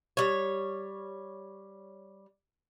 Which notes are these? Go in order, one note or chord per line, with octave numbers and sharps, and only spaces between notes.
G3 C#5